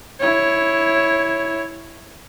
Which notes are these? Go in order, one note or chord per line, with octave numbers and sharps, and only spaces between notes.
E4 C#5